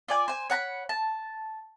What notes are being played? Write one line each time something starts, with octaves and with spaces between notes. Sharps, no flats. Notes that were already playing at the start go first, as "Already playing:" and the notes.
F4 D5 G#5
C5 G#5
C#5 F#5 A#5 B5
A5